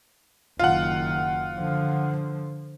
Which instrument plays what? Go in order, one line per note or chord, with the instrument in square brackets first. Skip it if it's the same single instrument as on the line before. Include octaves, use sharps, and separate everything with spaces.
[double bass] F#1 D#3 [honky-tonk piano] F4 F#5
[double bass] D3 F3